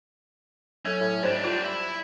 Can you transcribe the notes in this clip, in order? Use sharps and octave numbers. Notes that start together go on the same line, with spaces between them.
F#3 C#4 A4
A2
G#2 G3 D4 C5
D4 F4 C5
E4